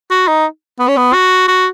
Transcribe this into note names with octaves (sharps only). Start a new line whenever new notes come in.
F#4
D#4
B3
C#4
B3
F#4
F#4